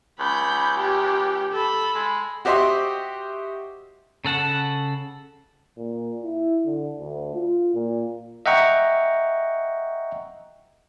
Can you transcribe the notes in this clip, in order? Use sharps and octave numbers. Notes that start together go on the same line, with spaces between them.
C#2 B5 G6
G4
A4 B5
G#3
F#4 G4 C5 D#5 E5 C6
C#3 A4 F#5 A5
A#2
E4
D3
D2
F4
A#2
D#5 E5 F#5 G5 A#5 C#6